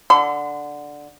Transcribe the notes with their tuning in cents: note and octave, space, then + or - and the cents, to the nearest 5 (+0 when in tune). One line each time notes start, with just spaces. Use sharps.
D3 +0 C6 -45